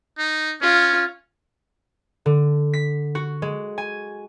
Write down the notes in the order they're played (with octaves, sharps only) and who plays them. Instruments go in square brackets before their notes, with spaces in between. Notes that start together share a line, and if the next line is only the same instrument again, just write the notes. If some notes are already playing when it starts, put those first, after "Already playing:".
[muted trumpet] D#4
[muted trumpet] C#4 [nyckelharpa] F4
[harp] D3
B6
F#4
G#3
G#5